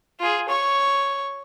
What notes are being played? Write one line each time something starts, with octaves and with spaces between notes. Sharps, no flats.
F4 G#4
C#5 C#6